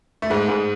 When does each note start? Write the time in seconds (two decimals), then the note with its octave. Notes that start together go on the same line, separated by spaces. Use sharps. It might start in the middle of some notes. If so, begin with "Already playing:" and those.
0.22 A3
0.30 G#2 G#3
0.48 G#2 G#3